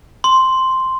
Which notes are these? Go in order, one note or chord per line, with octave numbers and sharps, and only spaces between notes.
C6